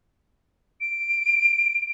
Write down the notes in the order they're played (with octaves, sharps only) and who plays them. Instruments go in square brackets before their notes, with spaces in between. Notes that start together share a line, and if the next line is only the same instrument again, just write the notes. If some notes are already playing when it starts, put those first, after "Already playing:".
[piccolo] D7